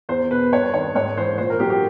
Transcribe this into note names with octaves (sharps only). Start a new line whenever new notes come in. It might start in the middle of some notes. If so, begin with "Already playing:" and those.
E2 C5
B2 B4
G2 C#5
D#3 C#5
G#2 C#5
E3 C5
A#2 C5
A#4
F#3 G4
G4